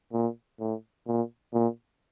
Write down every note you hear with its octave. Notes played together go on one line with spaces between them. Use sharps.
A#2
A2
A#2
A#2